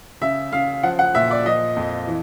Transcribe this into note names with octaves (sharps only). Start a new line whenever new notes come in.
C#3 E5
C#3 F5
F3 F#5
F#5
A#2 E5
D5
F3 D#5
F2
E3